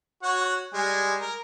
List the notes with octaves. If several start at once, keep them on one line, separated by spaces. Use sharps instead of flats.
F#4 C#5 F#5
G3 G#3 G#5
A#4